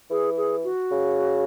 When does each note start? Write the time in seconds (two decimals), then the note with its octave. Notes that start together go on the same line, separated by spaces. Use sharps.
0.10 E3 G#4
0.37 G#4
0.64 F#4
0.91 C#3